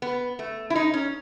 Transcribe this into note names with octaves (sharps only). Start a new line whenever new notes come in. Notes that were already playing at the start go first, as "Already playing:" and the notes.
B3
A3
E4
D#4
C#4